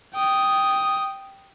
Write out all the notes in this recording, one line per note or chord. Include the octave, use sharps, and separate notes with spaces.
G5 D#6